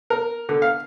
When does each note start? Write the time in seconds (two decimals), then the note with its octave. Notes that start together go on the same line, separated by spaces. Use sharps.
0.10 A#4
0.49 D3
0.62 F5